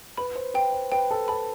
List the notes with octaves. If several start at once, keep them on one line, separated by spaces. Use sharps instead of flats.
B4 B5
C5
B4 G5
C5
B4 G5
A4
A4 B5